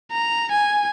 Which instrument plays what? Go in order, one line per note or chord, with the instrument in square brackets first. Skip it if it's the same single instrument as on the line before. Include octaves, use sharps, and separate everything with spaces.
[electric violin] A#5
G#5